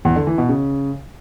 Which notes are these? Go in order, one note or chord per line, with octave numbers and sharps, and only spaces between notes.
E2
D3
E3
B2
C#3